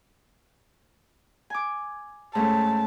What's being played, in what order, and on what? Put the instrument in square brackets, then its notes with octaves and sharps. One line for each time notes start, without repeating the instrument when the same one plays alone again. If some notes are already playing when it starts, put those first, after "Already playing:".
[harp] G#5 D6
[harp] G#2 A3 C#4 [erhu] A5